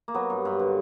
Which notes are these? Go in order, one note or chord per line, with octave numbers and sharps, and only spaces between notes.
A#3
F#3 B3
G2
G2
D3